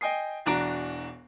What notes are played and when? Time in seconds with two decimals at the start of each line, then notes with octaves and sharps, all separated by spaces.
0.01 D#5 G5 G#5 D#6 C7
0.46 E1 E3 D4 F#4 A#5 D7